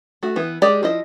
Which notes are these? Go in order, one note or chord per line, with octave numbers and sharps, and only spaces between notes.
A3 F#4
E3 B3
G#3 G4 D5
F3 E4 D#5